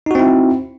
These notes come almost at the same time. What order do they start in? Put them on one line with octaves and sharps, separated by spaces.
D#4 F#4 C4 E4